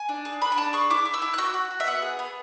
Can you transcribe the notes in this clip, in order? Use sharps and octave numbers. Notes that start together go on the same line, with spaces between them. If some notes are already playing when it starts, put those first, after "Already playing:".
Already playing: G#5
D4
G#4
D4 B5
G#5
D4 A5
G#4 C#6
E4 D6
E4
E6
E4
F#6
F#4 E6
F#4
F#4
E5
B3 F#5
G#4
B3